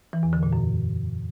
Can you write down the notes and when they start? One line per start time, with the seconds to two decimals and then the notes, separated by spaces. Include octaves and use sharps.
0.13 E3
0.23 E2
0.33 D3
0.43 A#2
0.53 F#2